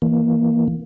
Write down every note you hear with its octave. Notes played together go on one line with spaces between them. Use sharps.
E3 A#3